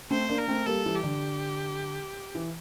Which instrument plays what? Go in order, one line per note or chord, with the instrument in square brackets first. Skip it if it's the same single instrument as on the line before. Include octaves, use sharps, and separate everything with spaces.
[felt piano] A3 C4 [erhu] C5
[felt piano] A#3 D4
[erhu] A#4
[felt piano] A3 C4
[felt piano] G3 A#3 [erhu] A4
[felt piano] E3 G3
[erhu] G4
[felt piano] D3
E3